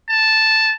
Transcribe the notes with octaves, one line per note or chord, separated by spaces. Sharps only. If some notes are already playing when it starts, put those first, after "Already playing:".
A5